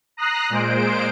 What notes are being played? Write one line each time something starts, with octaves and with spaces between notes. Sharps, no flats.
A#5 D#6 F#6 A#6 C7
A#2 G#3 C5 D7